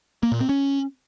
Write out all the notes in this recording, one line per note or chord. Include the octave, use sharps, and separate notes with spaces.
A#3
A#2
C4
C#4